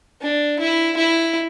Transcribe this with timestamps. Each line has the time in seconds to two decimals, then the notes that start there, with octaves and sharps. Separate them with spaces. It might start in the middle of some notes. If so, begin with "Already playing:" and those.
0.22 D4
0.59 E4
0.97 E4